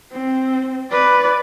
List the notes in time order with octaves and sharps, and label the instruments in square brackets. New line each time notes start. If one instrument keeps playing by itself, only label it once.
[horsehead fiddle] C4
B4 D5